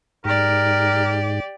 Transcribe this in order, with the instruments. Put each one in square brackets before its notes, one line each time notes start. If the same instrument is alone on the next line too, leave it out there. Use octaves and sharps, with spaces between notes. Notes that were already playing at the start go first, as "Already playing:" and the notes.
[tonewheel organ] G#2 [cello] G4 D5 [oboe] A#4